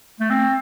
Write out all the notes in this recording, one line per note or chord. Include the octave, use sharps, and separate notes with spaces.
A3
C4